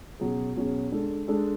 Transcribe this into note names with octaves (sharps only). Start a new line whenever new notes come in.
B2 F#3 C#4 G#4
B2 F#3 C#4 G#4
G#3 D4 A4
G#3 D4 A4